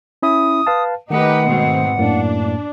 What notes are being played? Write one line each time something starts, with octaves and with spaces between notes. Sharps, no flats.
C#4 E4 E5 D#6
B4 F5 A5
D#3 A3 D#4 G4 B4 D#5 F#5
G#2 B2 C4
F#2 A2 A#3 D4